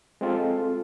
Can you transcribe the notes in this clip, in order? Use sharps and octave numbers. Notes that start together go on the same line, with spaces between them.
G#3 C4 F4 A4